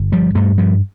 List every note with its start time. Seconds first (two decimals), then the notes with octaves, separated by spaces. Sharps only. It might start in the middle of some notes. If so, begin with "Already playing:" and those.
Already playing: G1
0.12 F3 G3
0.35 G2 G3 A3
0.58 F3 G3